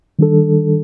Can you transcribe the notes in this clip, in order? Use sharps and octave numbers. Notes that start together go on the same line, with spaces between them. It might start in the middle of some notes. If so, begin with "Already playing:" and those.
D#3 G3 D4 A4